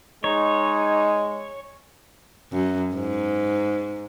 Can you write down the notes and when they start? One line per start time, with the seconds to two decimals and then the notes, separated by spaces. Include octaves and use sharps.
0.24 G#3 D#4 C#5
2.52 F#2
2.94 G#2